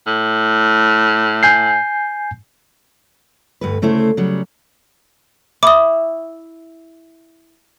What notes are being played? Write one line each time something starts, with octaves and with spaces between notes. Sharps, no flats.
A2
G#5 G6 C7
D2 G2 B4
D2 C#3 A3 E4 C5
C#3 F#3 G3
E4 D6 D#6